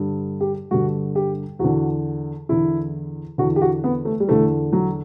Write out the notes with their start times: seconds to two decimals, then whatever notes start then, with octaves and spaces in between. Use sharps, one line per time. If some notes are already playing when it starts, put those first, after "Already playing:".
Already playing: G2 D3
0.41 G4
0.71 G2 D3 F#4
1.15 G4
1.59 E2 D3 F#4
2.49 E2 D3 E4
3.38 E2 D3 F#4
3.56 G4
3.62 F#4
3.84 B3
4.05 A3
4.20 G3
4.28 E2 D3 A3
4.73 F#3